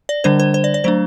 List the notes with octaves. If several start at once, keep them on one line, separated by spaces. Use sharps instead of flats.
D5
D3 G3 D4 C5
C5
C5
D5
D5
F#3 A3 D4 C5